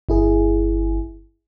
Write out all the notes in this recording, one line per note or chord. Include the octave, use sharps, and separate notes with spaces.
G1 E4 G#4